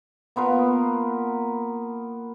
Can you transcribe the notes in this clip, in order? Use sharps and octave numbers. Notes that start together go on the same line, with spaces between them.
A#3 B3 F4 A#4